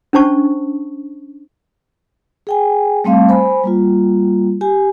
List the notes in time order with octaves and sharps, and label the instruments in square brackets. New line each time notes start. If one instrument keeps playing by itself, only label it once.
[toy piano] C#4 D4 C5 A5 C#6
[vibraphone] G#4 G5 G#5
G3 A3 C4 F5 A5
C5 G#5 B5
G3 A#3 F4
G4 G#5